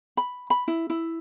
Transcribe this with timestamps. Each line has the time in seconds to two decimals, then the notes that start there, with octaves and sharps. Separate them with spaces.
0.17 B5
0.50 B5
0.68 E4
0.90 E4